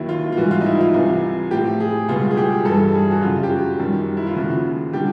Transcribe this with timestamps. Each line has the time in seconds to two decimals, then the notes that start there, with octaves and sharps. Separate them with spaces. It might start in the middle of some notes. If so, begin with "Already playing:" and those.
Already playing: D#2 D#3 F#3 E4
0.09 F4
0.32 F4
0.37 G#2 E3 G3 F#4
0.51 F4
0.61 D#4
0.66 E4
0.81 F4
0.94 C2 C3 E3
1.51 A2 F3 G4
1.80 G#4
2.08 C#2 B2 G3 F4
2.31 G#4
2.37 G4
2.65 G2 E3 G3 A4
2.94 G#4
3.11 F#4
3.22 F#2 C#3 F#3 F4
3.43 G4
3.50 F#4
3.79 F#2 D#3 G3
4.17 E4
4.27 F4
4.36 D#2 C#3 F3 F#4
4.93 D3 G3 G4